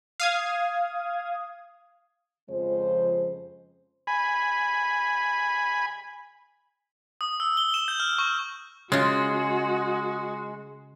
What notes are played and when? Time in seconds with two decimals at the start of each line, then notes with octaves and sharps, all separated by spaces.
0.20 F5 D#6 G#6
2.49 F2 C#3 F3 G#3 C5
4.07 G#5 B5
7.21 D#6
7.40 E6
7.57 G7
7.74 E7
7.88 G6
8.00 F6
8.19 C#6
8.92 C#3 G#3 F4 F#4